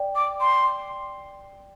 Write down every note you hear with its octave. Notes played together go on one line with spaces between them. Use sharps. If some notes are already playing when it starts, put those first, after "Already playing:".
Already playing: D5 G5
D6
C6